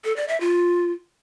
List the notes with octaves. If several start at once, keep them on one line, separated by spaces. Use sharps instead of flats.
A4
D5
E5
F4